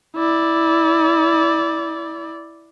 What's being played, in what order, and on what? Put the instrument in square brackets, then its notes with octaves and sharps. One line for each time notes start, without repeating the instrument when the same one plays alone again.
[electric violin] E4 D5